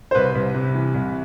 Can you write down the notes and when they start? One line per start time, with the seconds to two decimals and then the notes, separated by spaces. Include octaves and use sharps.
0.11 C5
0.15 C2 B4
0.35 C2
0.55 C3
0.75 E3
0.94 C2